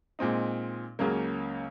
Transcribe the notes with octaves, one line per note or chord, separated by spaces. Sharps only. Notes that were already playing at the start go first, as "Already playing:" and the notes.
A#2 G#3 C4 D#4
C#2 C#3 F#3 A#3